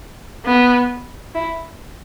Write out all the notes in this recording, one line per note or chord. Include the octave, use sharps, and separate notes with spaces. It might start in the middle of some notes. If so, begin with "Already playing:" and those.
B3
E4